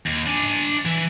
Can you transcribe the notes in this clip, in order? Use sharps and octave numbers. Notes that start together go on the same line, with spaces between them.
D#2
D4 G#5
E3